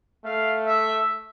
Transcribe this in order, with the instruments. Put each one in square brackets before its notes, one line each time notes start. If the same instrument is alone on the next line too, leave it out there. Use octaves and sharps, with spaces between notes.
[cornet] A3 [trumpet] F5
[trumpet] E5